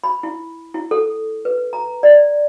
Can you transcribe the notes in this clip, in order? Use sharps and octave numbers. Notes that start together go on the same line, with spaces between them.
B5
E4
E4
A4
B4
A#5
D5